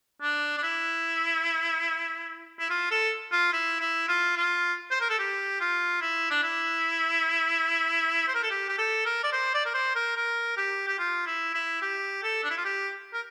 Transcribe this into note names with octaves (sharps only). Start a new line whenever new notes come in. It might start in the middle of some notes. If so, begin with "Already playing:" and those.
D4
D4
E4
E4
F4
A4
F4
E4
E4
F4
F4
C5
A#4
A4
G4
F4
E4
D4
E4
C5
A#4
A4
G4
G4
A4
A#4
D5
C5
D5
A#4
C5
A#4
A#4
G4
G4
F4
E4
E4
G4
A4
D4
E4
F4
G4
A#4